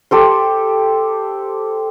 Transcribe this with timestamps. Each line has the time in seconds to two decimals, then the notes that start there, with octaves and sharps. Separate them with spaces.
0.11 G4 A4 C5